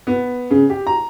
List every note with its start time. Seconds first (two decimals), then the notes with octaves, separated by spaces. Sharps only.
0.07 B3
0.50 C#3
0.70 G4
0.87 A#5